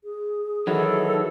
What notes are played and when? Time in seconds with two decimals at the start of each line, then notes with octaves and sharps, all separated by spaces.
0.04 G#4
0.67 D#3 E3 F#3 A4